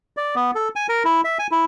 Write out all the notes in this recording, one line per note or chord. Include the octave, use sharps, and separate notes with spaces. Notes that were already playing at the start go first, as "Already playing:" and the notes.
D5
B3
A4
G#5
A#4
E4
E5
G#5
E4